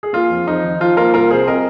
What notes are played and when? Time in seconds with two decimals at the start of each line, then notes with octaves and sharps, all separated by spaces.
0.03 G#4
0.13 A#3 F4
0.30 F2
0.47 F2 D#4
0.64 D#3
0.80 F3 F4
0.97 A#3 F4 A#4
1.14 C2 F4 A#4
1.30 C3 G#4 C5
1.47 C4 A#4 D#5